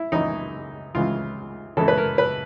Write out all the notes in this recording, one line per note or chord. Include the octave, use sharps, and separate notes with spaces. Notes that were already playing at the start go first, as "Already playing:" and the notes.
Already playing: E4
C#2 C#3 E3 D#4
C#2 C#3 E3 F4
C#2 C#3 E3 A4
B4
A#4
B4